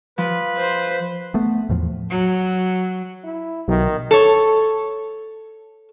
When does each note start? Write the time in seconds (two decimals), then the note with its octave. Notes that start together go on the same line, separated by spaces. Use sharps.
0.18 F3 B4
0.58 C5
1.34 A3 B3
1.69 E2 A2 F3
2.10 F#3
3.24 E4
3.68 B1 D#3
4.11 A4 C#5